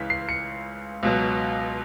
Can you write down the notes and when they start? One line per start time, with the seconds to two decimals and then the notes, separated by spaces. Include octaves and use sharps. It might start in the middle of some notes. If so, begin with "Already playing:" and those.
Already playing: C#2 C#3 E3 B6
0.10 C7
0.29 C#7
1.03 C#2 B2 F#3